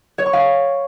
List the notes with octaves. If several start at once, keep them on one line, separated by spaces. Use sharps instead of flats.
C#5
C#6
F5